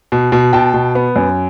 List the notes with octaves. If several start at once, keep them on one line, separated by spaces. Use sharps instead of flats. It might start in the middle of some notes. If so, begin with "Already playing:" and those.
B2
B2
B2 G5 A5
B2
B3
F#2